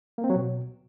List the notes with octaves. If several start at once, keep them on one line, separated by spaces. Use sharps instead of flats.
A#3
C4
F#3
B2